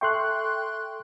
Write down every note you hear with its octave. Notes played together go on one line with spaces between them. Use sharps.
A4 E5 G5 C6 C#6 F#6